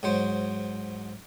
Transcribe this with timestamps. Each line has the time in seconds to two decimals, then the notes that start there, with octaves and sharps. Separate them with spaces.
0.03 G#2 F#3 C5